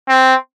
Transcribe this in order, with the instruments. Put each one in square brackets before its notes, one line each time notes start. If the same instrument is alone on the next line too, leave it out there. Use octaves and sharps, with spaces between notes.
[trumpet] C4